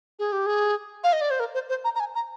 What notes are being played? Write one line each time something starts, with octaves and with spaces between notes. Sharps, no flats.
G#4
G4
G#4
F5
D#5
D5
C5
A#4
C5
C5
A#5
A#5
G#5
A#5